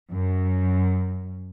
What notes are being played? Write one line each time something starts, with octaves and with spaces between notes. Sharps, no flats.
F#2